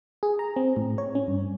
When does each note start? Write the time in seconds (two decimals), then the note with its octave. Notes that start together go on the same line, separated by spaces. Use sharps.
0.23 G#4
0.39 A#5
0.56 C4
0.76 A2
0.98 C#5
1.15 C#4
1.28 G2